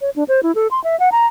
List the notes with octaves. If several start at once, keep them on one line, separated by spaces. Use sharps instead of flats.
C#5
D4
C5
E4
A4
C6
E5
F#5
A#5